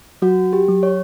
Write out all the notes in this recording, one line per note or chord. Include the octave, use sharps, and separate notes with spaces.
F#3 F#4
G4
F#3
C#5